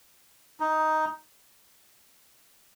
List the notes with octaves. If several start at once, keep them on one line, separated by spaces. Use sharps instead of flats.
D#4